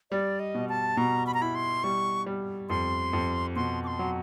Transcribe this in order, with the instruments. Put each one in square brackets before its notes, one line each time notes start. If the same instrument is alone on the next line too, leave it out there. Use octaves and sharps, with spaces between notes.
[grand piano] G3 [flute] D5
[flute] D#5
[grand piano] B2
[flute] A5
[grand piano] B2 [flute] A#5
[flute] B5
A#5
[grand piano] E4 [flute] B5
[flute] C6
[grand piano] G3 [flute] C#6
[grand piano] G3
[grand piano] F2 [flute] C6
[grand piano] F2
[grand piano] B2 [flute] C6
[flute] D6
C6
[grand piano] F#3